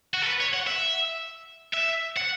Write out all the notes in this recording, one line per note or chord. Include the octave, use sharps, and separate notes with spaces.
F#4
A4
B4
C#5
F#5
E5
E5
F#5